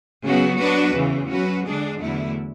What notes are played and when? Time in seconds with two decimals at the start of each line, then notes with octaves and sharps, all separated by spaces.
0.24 C#3 F#3 B3 F#4
0.59 F#3 B3 D4 F#4 B4
0.94 E2 C#3 E3
1.30 F#3 C#4 F#4 B4
1.65 D3 G#3 D4 G#4
2.00 E2 D3 F#3 A3 E4